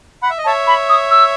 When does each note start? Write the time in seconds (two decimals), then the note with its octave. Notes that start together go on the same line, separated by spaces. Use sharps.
0.22 F#5 B5
0.30 E5
0.38 D#5
0.45 C#5 E5 A5
0.67 B5
0.89 D#6
1.11 E6